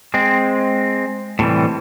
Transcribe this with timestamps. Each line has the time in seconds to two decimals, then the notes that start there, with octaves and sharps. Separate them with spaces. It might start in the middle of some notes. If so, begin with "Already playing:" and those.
0.14 G#3 C4
1.39 A2 C3 E3 G3